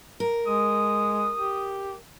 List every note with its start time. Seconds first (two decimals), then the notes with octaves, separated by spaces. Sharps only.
0.20 A#4
0.47 G#3 D#6
1.35 G4